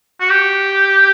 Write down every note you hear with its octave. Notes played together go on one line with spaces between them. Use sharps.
F#4
G4